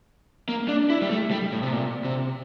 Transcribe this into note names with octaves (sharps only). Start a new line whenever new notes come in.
A#3
D4
E4
G3
A3
G3
A2
C3
A#2
C3